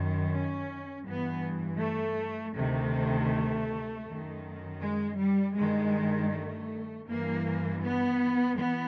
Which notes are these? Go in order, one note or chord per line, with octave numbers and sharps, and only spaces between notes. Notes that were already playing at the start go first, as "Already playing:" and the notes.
Already playing: F#2 D#3
C#4
G2 E3 B3
A3
D2 C3 D#3 A3
F#2 D#3
G#3
G3
G2 D#3 G#3
A3
G2 E3 A#3
B3
E3 B3